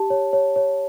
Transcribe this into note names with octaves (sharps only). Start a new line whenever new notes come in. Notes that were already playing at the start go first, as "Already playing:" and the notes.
Already playing: G4 A5
C#5
C#5
C#5